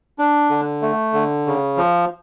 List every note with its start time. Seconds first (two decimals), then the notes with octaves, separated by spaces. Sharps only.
0.19 D4
0.50 D3
0.82 A3
1.13 D3
1.46 C#3
1.77 F3